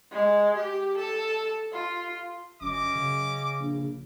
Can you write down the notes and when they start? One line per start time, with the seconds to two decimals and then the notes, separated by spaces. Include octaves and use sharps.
0.12 G#3
0.56 G4
0.97 A4
1.73 F4
2.61 G1 F#2 C#4 D#5 D6
2.95 C#3
3.60 A#1